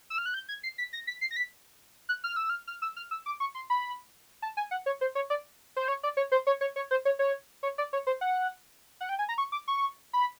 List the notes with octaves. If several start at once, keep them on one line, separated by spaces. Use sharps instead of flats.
E6
F6
F#6
G6
G#6
C7
B6
A#6
B6
C7
A#6
B6
F#6
F6
E6
F6
F6
E6
F6
E6
D6
C#6
C6
B5
A5
G#5
F#5
C#5
C5
C#5
D5
C5
C#5
D5
C#5
C5
C#5
C#5
C#5
C5
C#5
C#5
C#5
D5
C#5
C5
F#5
F#5
G5
G#5
A#5
C#6
D6
C#6
B5